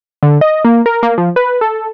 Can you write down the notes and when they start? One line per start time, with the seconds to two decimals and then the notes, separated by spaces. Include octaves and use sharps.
0.23 D3
0.41 D#5
0.65 A#3
0.86 A#4
1.03 A#3
1.18 F3
1.36 B4
1.61 A4